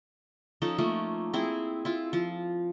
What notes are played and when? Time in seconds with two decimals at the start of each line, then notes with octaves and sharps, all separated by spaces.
0.62 F3 C#4 D#4 A4
0.78 F3 A3 A#3 C#4
1.33 C4 E4 G#4
1.85 E4 F4
2.13 F3